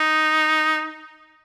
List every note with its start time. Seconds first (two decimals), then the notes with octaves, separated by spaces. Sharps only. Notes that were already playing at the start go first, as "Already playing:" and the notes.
Already playing: D#4